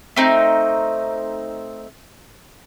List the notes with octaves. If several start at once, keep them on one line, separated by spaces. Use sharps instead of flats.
A3 C4 D#4